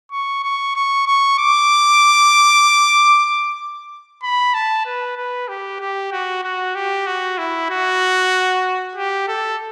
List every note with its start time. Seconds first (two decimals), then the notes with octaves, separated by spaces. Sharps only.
0.11 C#6
0.44 C#6
0.76 C#6
1.07 C#6
1.39 D6
4.23 B5
4.54 A5
4.85 B4
5.17 B4
5.48 G4
5.80 G4
6.12 F#4
6.44 F#4
6.75 G4
7.07 F#4
7.38 E4
7.70 F#4
8.96 G4
9.28 A4